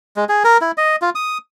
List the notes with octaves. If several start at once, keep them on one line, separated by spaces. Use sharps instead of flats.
G#3
G#4
A#4
E4
D#5
F4
D#6